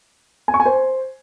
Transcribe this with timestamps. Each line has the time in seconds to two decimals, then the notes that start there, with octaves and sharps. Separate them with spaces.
0.48 G#5
0.54 C#6
0.60 G#5
0.65 C5